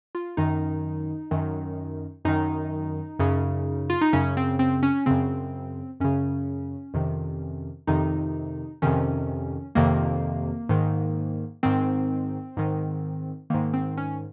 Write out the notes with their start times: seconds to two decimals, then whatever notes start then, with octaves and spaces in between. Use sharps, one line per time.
0.15 F4
0.37 F#2 D#3 D#4
1.31 F#2 D#3
2.25 F#2 D#3 D#4
3.19 F#2 C#3
3.90 F4
4.01 D#4
4.13 F#2 C#3 C#4
4.37 C4
4.59 C4
4.83 C#4
5.06 F#2 C#3 C4
6.00 F#2 C#3 C#4
6.94 F2 C3 D#3
7.87 F2 C3 D#3 D#4
8.82 F2 C3 D#3 C#4
9.75 F2 C3 D#3 A#3
10.69 G#2 D#3
11.63 G#2 D#3 C4
12.57 G#2 D#3
13.50 G#2 D#3 A#3
13.74 C4
13.97 C#4